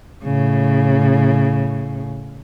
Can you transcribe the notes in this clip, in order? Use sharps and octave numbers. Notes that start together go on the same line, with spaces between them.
A2 C#3